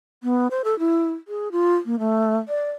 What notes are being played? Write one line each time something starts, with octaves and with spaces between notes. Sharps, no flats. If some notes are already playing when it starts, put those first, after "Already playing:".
B3
C5
A4
E4
G#4
F4
A#3
A3
D5